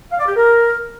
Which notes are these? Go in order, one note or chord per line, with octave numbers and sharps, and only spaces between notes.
F5
D5
G4
A#4